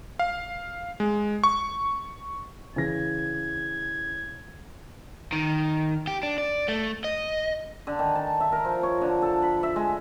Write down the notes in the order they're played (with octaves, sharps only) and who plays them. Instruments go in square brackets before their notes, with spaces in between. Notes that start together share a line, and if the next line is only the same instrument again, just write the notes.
[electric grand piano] F5
G#3
C#6
[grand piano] C#3 E3 A#6 [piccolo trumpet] G#6
[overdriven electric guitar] D#3
G4
D4
D5
A3
D#5
[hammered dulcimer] D3
D#3
A5
E5
A#4
F3
C#5
D3
A4
B5
E5
G#3